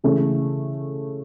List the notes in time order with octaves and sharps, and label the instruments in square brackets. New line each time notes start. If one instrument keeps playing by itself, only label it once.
[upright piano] C#3 E3 A3 C#4